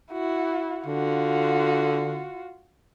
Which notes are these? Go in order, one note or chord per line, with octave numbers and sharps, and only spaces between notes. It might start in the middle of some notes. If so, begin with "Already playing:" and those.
E4 F#4
D3 F4 F#4